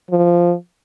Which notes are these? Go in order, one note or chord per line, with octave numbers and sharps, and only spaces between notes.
F3